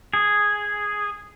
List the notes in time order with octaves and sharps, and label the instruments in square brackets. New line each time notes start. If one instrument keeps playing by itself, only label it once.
[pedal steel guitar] G#4